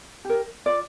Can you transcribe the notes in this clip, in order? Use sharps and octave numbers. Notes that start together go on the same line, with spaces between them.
G4 A#4
F4 D5